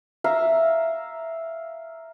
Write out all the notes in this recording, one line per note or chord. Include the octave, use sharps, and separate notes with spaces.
E5 F5 A#5